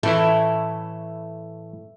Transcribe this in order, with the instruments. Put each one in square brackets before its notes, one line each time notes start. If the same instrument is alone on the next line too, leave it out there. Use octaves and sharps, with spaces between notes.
[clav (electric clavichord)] A2 E3 E4 [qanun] A3